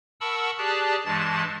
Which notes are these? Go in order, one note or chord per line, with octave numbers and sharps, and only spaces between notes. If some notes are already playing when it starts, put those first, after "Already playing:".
A#4 F#5 A5 B5 C#6 E6
G4 G#4 D5 A5 F#6
G2 E3 G#3 A5 A6